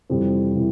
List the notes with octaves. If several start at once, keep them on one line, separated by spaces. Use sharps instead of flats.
F2 C3 E3 G3
C3 E3